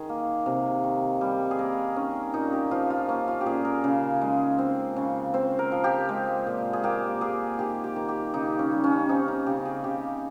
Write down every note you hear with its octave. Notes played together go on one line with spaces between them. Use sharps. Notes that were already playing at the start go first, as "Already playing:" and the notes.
Already playing: D#3 G#4
A#3
C3
D#3
G3
G#4
A#3 A#4
D#3 C#4
A#2 D#4
G4
F3 F4
F4
A#3 C#4
F4
G4
A#2 G#4
A#4
C#3
G#3
C4
C#3
C4 C5
A#4
F3
G4
G#3
A#2
G#4
A#3 G4
A#3 G#4
D#3 G4
G4
D#3
G4
C#3 D#4
C#4
G3
C#4
C4 D#4
D#4
C#3 G4
G#4
C#3 G4